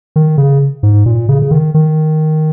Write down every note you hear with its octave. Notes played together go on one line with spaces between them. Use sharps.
D#3
C#3
G#2
A#2
C#3
C#3
D#3
D#3